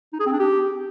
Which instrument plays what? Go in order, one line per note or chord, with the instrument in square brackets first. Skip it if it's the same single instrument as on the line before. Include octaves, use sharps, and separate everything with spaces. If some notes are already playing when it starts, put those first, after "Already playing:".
[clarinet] D#4
G#4
C4
D4
G4